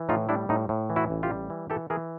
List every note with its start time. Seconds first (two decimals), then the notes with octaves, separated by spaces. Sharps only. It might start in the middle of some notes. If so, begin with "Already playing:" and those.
Already playing: E3
0.09 A2 D#4 F4
0.29 G3 D4 E4
0.49 A2 D#4
0.69 A2
0.90 E3
0.96 E4 F#4
1.10 A1
1.23 F4 G4
1.30 G3
1.50 E3
1.70 E3 G4 A4
1.90 E3 G#4 A#4